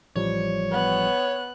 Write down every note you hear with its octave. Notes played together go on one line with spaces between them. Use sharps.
A1 F3 G3 C#5
B3 F#6